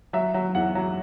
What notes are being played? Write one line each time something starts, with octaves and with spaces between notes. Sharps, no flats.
F#3 E5
F#3
E2 F#5
F#3